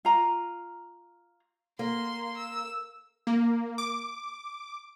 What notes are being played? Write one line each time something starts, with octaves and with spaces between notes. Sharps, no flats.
F4 A#5
A#3 C6
E6
A#3
D6